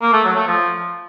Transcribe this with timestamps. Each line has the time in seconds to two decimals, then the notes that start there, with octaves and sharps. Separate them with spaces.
0.02 A#3
0.13 A3
0.24 F#3
0.36 A3
0.47 F3